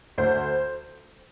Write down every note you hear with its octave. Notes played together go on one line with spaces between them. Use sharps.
D2 C5